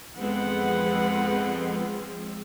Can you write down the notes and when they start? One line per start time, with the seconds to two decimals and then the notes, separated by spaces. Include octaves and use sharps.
0.19 F2 F3 G#3 B3 C4 B4 F#5